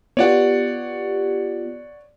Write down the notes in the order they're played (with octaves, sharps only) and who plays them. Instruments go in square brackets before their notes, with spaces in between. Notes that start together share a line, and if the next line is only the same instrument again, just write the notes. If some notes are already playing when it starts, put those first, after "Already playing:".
[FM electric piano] B3 F4 G4 [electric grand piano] C#5 D5 F#5